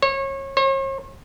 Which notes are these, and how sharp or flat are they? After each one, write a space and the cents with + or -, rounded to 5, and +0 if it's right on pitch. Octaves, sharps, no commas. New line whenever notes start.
C#5 -30
C#5 -45